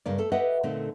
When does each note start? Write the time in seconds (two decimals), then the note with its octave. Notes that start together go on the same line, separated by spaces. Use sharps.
0.06 G2 C#3 A#3 D5
0.18 A3 A4
0.32 G4 B4 D#5 E5 F#5
0.63 A#2 D3 A3 C4 D#4